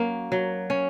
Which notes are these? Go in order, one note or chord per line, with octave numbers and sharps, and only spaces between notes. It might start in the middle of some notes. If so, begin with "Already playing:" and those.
Already playing: F#3 A#3 C#4
F#3
C#4